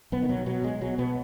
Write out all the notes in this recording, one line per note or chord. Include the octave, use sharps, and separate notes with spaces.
B1 B3
D#3
B2 F#3
B2 F#3
B1 G#3
B2 F#3
B2 B3